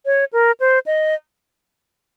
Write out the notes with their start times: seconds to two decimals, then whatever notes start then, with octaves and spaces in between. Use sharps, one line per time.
0.06 C#5
0.33 A#4
0.60 C5
0.86 D#5